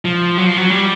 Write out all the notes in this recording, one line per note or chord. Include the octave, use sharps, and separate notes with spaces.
F3
F#3
F3
F#3
G3